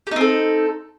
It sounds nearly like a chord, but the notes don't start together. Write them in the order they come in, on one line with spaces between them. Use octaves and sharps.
G4 D#4 C4 A4